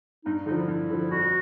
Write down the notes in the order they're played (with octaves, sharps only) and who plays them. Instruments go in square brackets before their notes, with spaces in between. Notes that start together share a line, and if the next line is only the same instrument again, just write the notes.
[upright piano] G2 [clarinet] D#4
[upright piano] D3 F3 [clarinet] D#4
[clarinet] E4
[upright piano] G2
D3 F3
[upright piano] F2 [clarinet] F#4